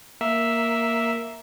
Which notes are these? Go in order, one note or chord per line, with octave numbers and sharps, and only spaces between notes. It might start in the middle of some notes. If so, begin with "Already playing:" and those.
A#3 E5